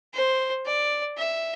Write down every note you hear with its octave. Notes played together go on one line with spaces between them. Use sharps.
C5
D5
E5